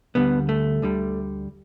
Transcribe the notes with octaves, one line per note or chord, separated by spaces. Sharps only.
D2 D3 G3 B3
A3
D2 D3 G3